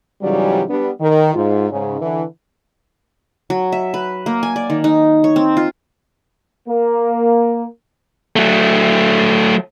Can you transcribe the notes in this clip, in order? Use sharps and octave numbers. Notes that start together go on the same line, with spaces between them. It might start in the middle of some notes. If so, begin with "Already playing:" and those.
G#2 C#3 E3 F#3 G3
G3 B3 D4
D#3
G#2 F4
G#2 C#3
D3 E3
F#3
E5
B4
A#3
G#5
D5
D#3
D#4
C#5
C4
F4
A#3
F#3 A3